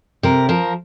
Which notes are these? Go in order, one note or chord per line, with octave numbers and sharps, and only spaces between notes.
C3 A#4
F3 A#4